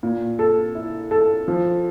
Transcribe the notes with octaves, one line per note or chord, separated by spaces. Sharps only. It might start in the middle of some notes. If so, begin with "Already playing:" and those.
A#2
A4
E4
A4
F3